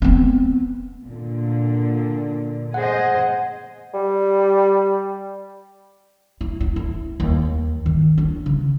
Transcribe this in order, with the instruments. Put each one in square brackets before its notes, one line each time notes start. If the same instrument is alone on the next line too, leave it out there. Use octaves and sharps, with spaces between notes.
[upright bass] B3 C4
[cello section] A#2 D3
[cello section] G#4 C5 D#5 [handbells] F#5
[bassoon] G3
[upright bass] E4
E4
E4
D#2
D#3
D4
C#3